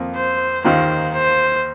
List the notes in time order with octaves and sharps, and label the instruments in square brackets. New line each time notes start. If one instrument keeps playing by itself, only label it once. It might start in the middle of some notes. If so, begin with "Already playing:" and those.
Already playing: [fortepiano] F2 F3 A#3
[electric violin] C5
[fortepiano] D#2 D#3 A#3 F4 [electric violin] C5
[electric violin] C5